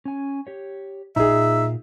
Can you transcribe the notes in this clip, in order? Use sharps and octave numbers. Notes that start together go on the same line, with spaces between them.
C#4 G#5
G4 C#5
A#2 D#4 F4 G#4 E5